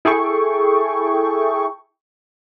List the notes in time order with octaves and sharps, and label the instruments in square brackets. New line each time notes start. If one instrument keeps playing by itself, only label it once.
[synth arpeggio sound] E4 G#4 A4 G5 C#6